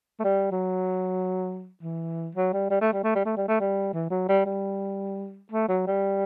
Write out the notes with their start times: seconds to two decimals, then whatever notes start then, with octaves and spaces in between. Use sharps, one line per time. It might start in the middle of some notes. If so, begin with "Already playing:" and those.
0.19 A3
0.24 G3
0.51 F#3
1.82 E3
2.35 F#3
2.53 G3
2.70 G3
2.81 A3
2.93 G3
3.04 A3
3.15 G3
3.25 A3
3.37 G3
3.48 A3
3.60 G3
3.93 E3
4.10 F#3
4.29 G3
4.45 G3
5.52 A3
5.68 F#3
5.87 G3